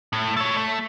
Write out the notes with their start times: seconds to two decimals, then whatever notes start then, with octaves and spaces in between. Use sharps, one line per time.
0.13 A2
0.37 A4 C#5
0.57 A3